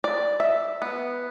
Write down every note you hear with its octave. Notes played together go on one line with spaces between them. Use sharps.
D5
E5
B3